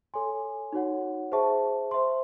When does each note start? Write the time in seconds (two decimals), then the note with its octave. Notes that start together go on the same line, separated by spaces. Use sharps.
0.14 A4 C#5 G#5 C6
0.72 D#4 F#4 C#5 F#5
1.32 G#4 C5 E5 A5 C#6
1.91 C5 E5 C6